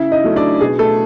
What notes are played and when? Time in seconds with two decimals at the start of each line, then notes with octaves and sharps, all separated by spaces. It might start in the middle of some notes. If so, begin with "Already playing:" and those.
Already playing: C#3 E4 E5
0.12 D#4 D#5
0.24 F#3 A3 C#4
0.36 D4 D5
0.61 B2 G#4
0.79 A3 A4